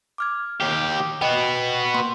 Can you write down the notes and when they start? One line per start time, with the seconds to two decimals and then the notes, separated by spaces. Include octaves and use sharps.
0.18 D6 F6 G#6
0.60 D#2 G4
1.22 B3 F#4 D#5 G5
1.94 A#3 C6